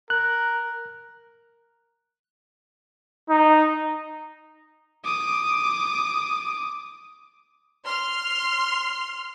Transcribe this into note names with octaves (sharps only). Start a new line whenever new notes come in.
A#4 F#6
D#4
D6 D#6
C6 F6